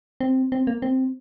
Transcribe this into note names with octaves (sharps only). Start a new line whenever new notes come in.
C4
C4
A#3
C4